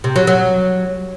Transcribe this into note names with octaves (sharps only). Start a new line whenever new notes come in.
C3
F#3
F#3